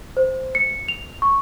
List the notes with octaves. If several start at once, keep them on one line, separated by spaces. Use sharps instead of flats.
C5
C#7
F7
C#6